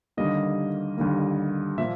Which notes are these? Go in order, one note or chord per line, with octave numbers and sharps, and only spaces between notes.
D#2 D3 G3 A#3 D#4 D#5
D#2 D3 G3 A#3 D#4
A#2 F3 A#3 E5